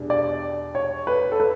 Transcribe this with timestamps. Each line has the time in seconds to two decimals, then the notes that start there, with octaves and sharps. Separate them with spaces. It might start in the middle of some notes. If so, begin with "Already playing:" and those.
Already playing: E2 B2 G3 D4
0.10 D5
0.75 C#5
1.07 B4
1.32 A4
1.40 B4